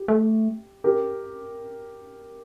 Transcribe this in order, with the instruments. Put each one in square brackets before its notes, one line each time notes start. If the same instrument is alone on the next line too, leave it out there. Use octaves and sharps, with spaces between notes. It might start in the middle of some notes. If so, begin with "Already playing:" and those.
Already playing: [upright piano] G4
[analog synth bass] A3
[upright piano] G4 A#4